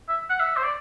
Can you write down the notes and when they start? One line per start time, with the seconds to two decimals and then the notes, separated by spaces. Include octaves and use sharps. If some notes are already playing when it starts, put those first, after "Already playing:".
0.09 E5
0.30 F#5
0.40 E5
0.57 C5
0.63 D5